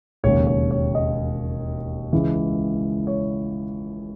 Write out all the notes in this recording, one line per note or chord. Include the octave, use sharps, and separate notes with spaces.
E1 D#2 C#3 C#5
C#5
C#5
D#5
C#2 C#3 E3
C#5